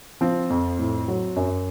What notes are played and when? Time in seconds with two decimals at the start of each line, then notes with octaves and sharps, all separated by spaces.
0.21 F3 C4
0.50 F2
0.79 A2
1.08 F#3
1.36 F#2